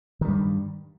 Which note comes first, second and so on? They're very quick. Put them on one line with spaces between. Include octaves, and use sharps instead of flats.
D#3 G3 G2